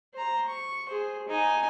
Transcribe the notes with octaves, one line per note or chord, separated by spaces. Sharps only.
C5 A#5
C#6
G#4 C5
D#4 G#5